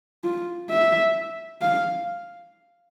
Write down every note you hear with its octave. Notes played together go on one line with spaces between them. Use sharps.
F4
E5
F5